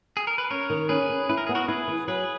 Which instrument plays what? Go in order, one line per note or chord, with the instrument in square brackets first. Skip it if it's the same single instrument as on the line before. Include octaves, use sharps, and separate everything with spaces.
[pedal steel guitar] G#4
A#4
B4
[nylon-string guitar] C#4 [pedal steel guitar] A#4 C#5
[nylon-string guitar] D#3
[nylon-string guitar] C#4 [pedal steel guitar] G#4 B4
[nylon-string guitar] C#4
[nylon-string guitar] E4 [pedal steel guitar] B4
[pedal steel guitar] A#4
[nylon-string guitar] B3 [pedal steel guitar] G#4
[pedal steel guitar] F#4 A#4
[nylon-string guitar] E4 [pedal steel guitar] G#4 B4
[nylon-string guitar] E3
[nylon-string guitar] F#3 [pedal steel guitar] G#4 B4